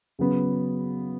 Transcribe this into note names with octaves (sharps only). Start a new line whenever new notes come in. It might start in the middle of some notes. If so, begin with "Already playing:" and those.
C#3 F#3 B3